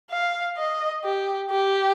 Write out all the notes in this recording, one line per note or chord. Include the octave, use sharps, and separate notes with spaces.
F5
D#5
G4
G4